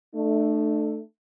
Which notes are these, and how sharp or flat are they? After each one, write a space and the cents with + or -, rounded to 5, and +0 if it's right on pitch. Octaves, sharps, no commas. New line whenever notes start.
A3 +0 D4 +45